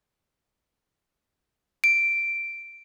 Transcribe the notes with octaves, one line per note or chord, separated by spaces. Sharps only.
D7